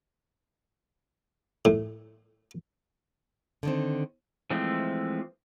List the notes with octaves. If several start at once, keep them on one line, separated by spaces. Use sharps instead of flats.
A2
D3 D#3 C4
E3 F3 G#3 A3 C4